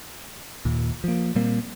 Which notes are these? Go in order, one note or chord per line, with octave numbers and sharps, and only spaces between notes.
D#2 A#2
F3 A#3
A#2 G3 A#3 C4